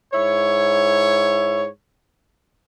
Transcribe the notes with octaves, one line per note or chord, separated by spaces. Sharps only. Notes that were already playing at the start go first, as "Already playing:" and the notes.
G#2 E4 C#5